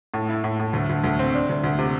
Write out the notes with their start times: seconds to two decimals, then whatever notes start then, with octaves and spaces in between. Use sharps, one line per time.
0.14 A2
0.29 E4
0.44 A2
0.59 A2
0.73 D2
0.89 D2
1.04 D2
1.19 C4
1.34 D4
1.49 D2
1.64 D2
1.79 C3